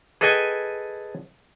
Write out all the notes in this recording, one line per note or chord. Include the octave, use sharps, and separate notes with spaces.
G#4 A4 B4 D#5 G5 G#5